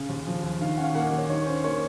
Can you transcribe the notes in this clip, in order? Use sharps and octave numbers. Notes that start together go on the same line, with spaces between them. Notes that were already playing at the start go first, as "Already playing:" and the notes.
Already playing: C#3
D#2
F3
D#2
D#3 F5
C#4 F#5
F5
A#3 F#5
D#5
D#2
C#5
D#3 C#5
C#4 C5
A#3 C#5